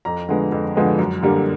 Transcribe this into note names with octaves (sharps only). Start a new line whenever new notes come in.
F2 A#5
D3 F3 G#3 B3
F2
D3 F3 G#3 B3
F#2
D3 G3 A#3